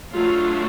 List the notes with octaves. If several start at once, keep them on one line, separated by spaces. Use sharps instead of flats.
F#3 A3 D4 F4